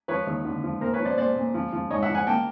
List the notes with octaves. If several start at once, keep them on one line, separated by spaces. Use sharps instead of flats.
F3 B4 C#5
D#2
D3
F3
A#2 A#4 C5
B4 C#5
F3
C5 D5
A#2 C5 D5
A#2
F3
F3
G#2 C#5 D#5
E5 F#5
F3
F#5 G#5
A#3 G5 A5